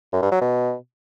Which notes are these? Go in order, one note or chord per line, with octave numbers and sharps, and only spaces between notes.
F#2
G2
F#3
B2